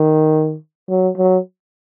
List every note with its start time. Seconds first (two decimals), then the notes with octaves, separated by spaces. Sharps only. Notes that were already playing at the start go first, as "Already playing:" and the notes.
Already playing: D#3
0.89 F#3
1.18 F#3